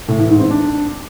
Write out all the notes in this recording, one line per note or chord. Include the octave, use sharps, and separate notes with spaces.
A2
E3
G#2
C4
D4